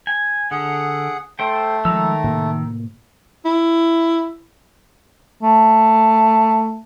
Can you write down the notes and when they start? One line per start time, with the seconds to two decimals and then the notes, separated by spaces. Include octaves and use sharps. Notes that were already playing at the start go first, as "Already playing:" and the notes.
0.07 G#5
0.51 D3 G#4 F#5
1.39 A3 A4 C5 G5
1.85 D#3 F3 G#3 A#5 E6
2.24 A2 C3 A#3
3.45 E4
5.43 A3